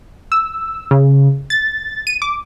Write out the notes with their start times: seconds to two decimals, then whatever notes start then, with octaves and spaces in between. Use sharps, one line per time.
0.32 E6
0.91 C#3
1.50 A6
2.07 D#7
2.22 D6